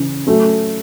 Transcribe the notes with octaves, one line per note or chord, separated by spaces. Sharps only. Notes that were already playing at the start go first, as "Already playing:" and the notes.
Already playing: C#3 E3 C#4
F#3 A3 C#4